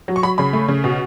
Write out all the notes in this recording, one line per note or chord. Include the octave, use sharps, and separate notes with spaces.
F#3
C#6
F#3 B5
C#3 B5
A3
C#3
B2